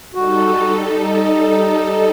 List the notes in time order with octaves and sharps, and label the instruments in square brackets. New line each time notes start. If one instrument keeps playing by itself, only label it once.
[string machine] G3 D#4 A4 [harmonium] F#4
[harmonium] D#4